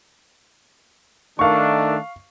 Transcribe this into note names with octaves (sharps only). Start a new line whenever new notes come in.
D#3 A3 D4 F5 C#6